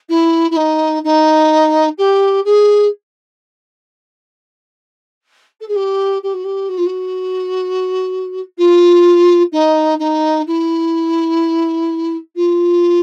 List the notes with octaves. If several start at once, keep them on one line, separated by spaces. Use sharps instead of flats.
E4
E4
D#4
D#4
G4
G#4
A4
G#4
G4
G4
F#4
G4
F#4
F4
F#4
F4
D#4
D#4
E4
F4